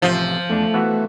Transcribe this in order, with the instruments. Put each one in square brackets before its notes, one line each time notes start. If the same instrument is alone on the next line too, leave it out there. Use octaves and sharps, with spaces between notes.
[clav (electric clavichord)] A1 C3 E5 [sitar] F3
[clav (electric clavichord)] E2 D4 [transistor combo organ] A3
[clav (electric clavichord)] E3 B3 F#4